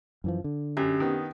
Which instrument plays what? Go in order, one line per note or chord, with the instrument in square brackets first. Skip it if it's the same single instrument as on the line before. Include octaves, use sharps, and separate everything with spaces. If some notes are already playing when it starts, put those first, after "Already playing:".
[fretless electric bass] F#2 E3 F3
D3
[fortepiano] F#2 [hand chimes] C#4 D4 G4
[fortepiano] D#3 B3